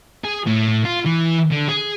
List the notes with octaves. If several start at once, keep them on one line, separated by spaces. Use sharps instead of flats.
G#4
A2
F4
E3
D3
G#4